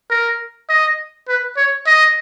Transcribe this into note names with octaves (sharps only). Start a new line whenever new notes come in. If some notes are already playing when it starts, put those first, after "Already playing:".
A#4
D#5
B4
C#5
D#5